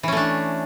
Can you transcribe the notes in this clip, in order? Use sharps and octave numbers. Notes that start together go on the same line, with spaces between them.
E3 A3 C#4 D4